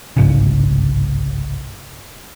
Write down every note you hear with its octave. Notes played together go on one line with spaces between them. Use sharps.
G1 C2 G#2 C#3